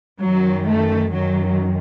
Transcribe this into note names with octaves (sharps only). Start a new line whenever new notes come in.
F#2 D#3 F#3
A3
F#2 D#3 F#3